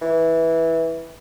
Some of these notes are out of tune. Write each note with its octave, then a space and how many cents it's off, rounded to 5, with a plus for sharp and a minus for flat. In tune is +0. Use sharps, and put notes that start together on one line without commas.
E3 -10